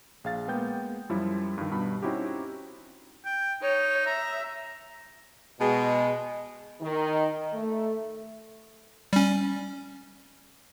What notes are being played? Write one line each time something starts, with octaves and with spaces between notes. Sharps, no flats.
A#1 G#4 F5 A6
G#3 A#3 B3 G5 G6
F#2 F3 G3 E4
G2 D#3
G2 B2 B5
C4 C#4 D#4 E4 F#4 G4
G5
D#4 C#5
E5 A#5
B2 G#3
D#3
A3
G3 C#4